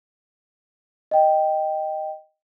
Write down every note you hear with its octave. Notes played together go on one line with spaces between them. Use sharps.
D#5 G5